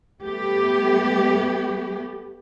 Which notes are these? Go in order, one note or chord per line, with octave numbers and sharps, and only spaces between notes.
G3 A3 B3 G4